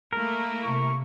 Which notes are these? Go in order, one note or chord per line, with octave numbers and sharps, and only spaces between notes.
A3 A#3 E4 A#4
C3 C#6